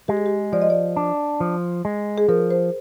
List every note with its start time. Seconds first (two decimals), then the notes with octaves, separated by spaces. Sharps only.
0.08 G#3 G4
0.17 G#4
0.26 G4
0.53 F3 D5
0.62 D#5
0.70 D5
0.96 D4
1.40 F3
1.85 G#3
2.18 G#4
2.28 F3 A#4
2.51 C5